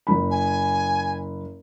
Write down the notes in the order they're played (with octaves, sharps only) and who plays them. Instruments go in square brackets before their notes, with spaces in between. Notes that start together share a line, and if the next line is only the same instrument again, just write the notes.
[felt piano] F#1 B5
[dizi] G#5